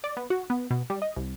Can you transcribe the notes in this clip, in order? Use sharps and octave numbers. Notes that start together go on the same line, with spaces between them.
D5
B3
F#4
B3
B2
G3
D#5
C2